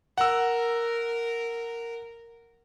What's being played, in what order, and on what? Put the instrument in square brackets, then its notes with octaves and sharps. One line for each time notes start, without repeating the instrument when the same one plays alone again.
[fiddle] A#4 [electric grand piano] F#5 E6